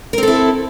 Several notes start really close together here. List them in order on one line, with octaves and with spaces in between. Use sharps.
A#4 C4 A4 E4